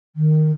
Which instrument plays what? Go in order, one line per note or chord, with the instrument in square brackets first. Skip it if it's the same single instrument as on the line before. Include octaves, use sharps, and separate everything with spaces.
[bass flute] D#3